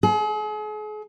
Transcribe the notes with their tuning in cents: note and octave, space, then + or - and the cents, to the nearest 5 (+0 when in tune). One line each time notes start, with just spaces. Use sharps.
G#4 +40